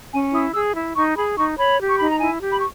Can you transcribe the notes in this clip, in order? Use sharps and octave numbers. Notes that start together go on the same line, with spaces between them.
C#4 G#5
E4 D#6
G#4 E6
E4
D#4 C#6
G#4 B5
D#4 C#6
C#5 B5
G4
C#6
D#4 B5
A#5
E4 G#5
G4
B5
C#6